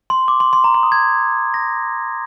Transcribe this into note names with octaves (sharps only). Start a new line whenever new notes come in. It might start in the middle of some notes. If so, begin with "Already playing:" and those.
C6
D6
C6
C6
A#5
C6
D#6
G#6
A#6